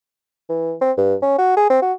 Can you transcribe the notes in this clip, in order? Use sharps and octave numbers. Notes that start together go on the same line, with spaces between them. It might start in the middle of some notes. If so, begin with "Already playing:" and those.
E3
C4
G2
C#4
F#4
G#4
C4
F#4